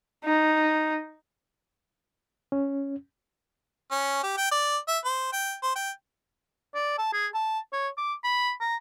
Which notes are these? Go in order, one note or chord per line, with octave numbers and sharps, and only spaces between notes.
D#4
C#4
C#4
G4
G5
D5
E5
C5
G5
C5
G5
D5
A5
G#4
A5
C#5
D6
B5
A#5